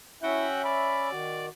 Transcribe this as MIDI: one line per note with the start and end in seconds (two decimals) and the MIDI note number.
0.23 1.11 61
0.23 0.48 64
0.23 0.61 66
0.23 1.11 76
0.23 0.61 78
0.23 0.61 79
0.64 1.46 74
0.64 1.09 83
1.11 1.49 51
1.11 1.49 66